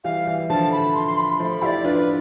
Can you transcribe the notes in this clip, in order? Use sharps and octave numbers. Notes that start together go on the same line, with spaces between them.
E3 G3 F5
E3 G3
D3 F3 A5
B5
C6
C6
B5
C6
F3 A3 B5
E4 G4 D5 F5
D4 F4 B4